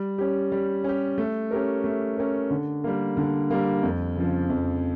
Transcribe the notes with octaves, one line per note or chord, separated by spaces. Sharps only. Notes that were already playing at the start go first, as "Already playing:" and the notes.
Already playing: G3
C#4 G4
G3
C#4 G4
A3
C#4 G4 A#4
A3
C#4 G4 A#4
D3
G3 A#3
D3
G3 A#3
F2
C#3 F3
F2